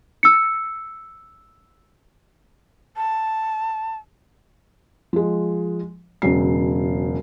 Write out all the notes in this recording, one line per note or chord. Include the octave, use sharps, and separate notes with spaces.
E6 C#7
A5
F3 G#3
E1 C#3 F#3 C7